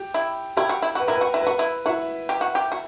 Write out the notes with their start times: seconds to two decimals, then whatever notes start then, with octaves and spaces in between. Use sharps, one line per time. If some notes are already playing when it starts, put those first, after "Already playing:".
Already playing: G4
0.14 E4
0.57 E4 G4
0.69 F#4
0.82 E4
0.95 F#4 B4
1.07 E4 A#4
1.15 B4
1.21 F#4
1.34 E4
1.42 F#4 B4
1.59 E4
1.86 E4 F#4
2.29 G4
2.41 F#4
2.55 G4
2.72 F#4